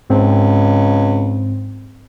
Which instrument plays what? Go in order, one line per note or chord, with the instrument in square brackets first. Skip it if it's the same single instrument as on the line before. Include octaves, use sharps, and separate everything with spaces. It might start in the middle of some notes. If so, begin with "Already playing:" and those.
[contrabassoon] C#2 [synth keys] G#2 C4